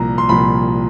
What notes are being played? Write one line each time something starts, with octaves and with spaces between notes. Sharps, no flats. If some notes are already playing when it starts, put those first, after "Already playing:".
Already playing: C2 A#2 F3 A#5
C6
C2 A#2 F3 B5